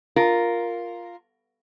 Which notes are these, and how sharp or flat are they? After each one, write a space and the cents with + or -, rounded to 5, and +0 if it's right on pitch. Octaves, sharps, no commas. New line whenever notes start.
F4 +0 A#4 +0